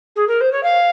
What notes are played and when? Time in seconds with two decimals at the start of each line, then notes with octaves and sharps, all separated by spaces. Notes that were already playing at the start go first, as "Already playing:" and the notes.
0.15 G#4
0.27 A#4
0.40 C5
0.52 C#5
0.63 F5